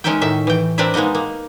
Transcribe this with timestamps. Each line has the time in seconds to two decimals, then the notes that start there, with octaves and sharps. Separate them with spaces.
0.04 G#3 C#4 D#4 A#4 E5 G5
0.21 A2 D#3 E5
0.47 E3 G5
0.78 C4 D4 A#4 B4 D5 E5
0.94 G#3 A#3 B3 D#4 D#5
1.15 A#3